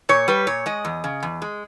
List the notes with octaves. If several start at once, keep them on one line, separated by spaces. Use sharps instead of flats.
A#2 C#5
G3 B4
A#2 C#5
G#3 D#5
E2
C#3
E2
G#3